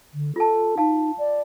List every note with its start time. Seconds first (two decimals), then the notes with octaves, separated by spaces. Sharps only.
0.14 D3
0.36 F4 A4 A5
0.78 D#4 F5 A5
1.18 D5